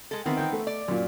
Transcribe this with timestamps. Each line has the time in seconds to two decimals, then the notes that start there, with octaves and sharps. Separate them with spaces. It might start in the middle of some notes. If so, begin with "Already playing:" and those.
0.11 G#3 A4
0.26 D#3 E3 B3 C4
0.37 D#3 G5
0.53 A3
0.67 D5
0.88 F#2 A#2